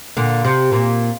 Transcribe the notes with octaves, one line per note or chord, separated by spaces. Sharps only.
A#2 D3
C3
A#2